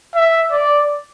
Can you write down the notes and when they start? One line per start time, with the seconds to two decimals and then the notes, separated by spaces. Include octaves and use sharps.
0.16 E5
0.52 D5